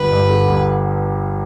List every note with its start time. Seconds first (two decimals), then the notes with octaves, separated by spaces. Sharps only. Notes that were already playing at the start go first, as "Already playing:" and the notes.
Already playing: G1 B4
0.12 G2
0.30 D3
0.48 G1